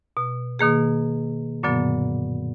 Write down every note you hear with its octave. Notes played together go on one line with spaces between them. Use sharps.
B2
B2 D#3 A#3 G#4
F#2 A#2 D3 F#3 B3